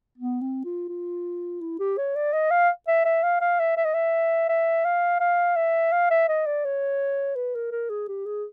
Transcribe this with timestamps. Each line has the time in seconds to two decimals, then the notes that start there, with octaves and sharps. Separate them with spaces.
0.18 B3
0.41 C4
0.65 F4
0.89 F4
1.61 E4
1.79 G4
1.98 C#5
2.16 D5
2.33 D#5
2.51 F5
2.88 E5
3.05 E5
3.23 F5
3.41 F5
3.59 E5
3.77 E5
3.85 D#5
3.94 E5
4.49 E5
4.85 F5
5.20 F5
5.56 E5
5.92 F5
6.10 E5
6.28 D#5
6.46 D5
6.65 C#5
7.36 B4
7.55 A#4
7.71 A#4
7.89 G#4
8.08 G4
8.26 G#4